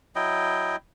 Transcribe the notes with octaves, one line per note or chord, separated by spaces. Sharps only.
F#3 E4 D#5 G5